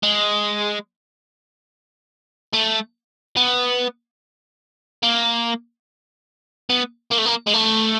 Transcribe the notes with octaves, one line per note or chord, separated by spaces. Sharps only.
G#3
A3
B3
A#3
B3
A#3
A3
A#3
G#3
A3